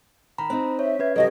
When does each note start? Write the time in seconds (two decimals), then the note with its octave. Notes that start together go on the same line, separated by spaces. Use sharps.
0.38 D#3 A#5 B5
0.50 C4 D#4 C5
0.79 C#5 E5
0.99 C#4 B4 G#6
1.16 G2 C#3 F#3 G4 A4 D#5